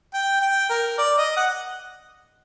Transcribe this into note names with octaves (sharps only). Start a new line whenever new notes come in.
G5
G5
A#4
D5
D#5
F#5